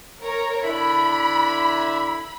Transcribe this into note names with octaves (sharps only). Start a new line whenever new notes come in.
A#4 C#5 A#5
D3 E4 B5